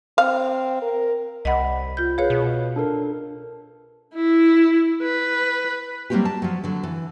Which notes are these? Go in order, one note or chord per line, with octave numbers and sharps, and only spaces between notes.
C4 F5
A#4
C2 D#5 F#5 B5 B6
F4 G6
G#4 B4 C#5 F5
B2
D4 A4 A#4
E4
B4
F#3 G3 A#3 C4 F#4 G4
A5
F3 F#3
D3 F#3
E3